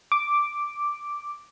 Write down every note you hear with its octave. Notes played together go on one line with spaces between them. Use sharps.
D6